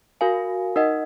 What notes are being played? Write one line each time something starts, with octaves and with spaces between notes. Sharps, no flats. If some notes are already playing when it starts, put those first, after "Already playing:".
F#4 A#4 F5 G#5
D#4 A#4 D#5 F#5